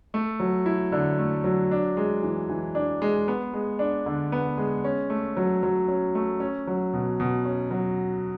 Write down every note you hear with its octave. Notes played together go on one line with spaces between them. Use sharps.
A3
F#3
E4
D3
A3
F#3
D4
G#3
E3
E3
D4
G#3
B3
G#3
D4
D3
B3
G#3
C#4
A3
F#3
F#3
C#4
A3
C#4
F#3
B2
B2
C#4
F#3